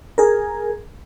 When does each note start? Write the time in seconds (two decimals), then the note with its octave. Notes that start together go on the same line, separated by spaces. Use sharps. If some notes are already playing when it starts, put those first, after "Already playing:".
0.18 G#4 A#4